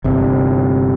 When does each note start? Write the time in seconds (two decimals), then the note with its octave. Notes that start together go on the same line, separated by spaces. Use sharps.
0.04 G1 C3